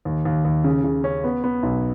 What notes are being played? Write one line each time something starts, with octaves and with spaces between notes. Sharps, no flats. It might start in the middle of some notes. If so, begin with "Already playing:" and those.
D#2
D#2
D#2
C#3
C#3
C#4
B3
B3
B1